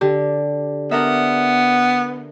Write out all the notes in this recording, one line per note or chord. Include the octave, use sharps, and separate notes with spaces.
D3 G4
B3 D4 A#4 E5